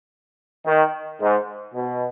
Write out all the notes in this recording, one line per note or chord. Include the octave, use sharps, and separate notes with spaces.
D#3
G#2
B2